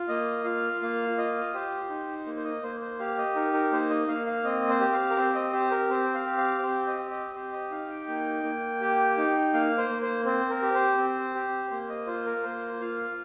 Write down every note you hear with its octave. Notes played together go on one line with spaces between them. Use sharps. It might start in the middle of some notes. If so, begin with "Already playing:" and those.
Already playing: F4
A#3 D#5
F4 F5
A#3 F5
F4 D#5
G4 C5
D#4
A#3
C5
D#5
A#3 C5
C5
G4 F5
D#5
D#4 A#4
A#4
A#3 C5
D#5
A#3 F5
F5
C4 D#5
C5
G4
F5
A#4
C4 C5
D#5
G4 C5
A#4
C4 C5
F5
G4
F5
C4 C5
D#5
G4
D#5
G4 C5
D#5
D#4 F5
G5
A#3
A#3
G4
D#4
A#3 F5
C5
A#3
C5
C4 C5
A#4
G4
C5
C4
G4
A#3 C5
D#5
F4 C5
A#4
A#3 C5
F4 F5